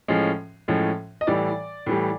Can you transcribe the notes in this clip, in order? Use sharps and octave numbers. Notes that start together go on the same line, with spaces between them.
A2 F3 G#3 C#4
A2 F3 G#3 C#4
D#5
A2 E3 G3 D5
A2 E3 G3